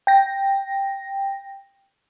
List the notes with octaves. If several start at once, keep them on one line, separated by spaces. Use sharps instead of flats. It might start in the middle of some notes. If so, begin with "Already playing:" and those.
G5 A#6